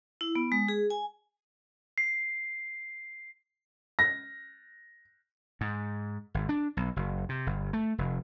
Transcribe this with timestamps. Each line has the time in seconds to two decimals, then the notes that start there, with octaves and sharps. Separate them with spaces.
0.21 E4
0.35 B3
0.52 G#3
0.68 G#4
0.90 G#5
1.98 C7
3.99 A#6
5.61 G#2
6.34 G#1
6.49 D4
6.77 B1
6.96 F#1
7.29 C3
7.47 G1
7.73 A3
7.98 F1